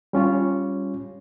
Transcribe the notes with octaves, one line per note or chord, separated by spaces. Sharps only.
G3 C#4 F4 C#5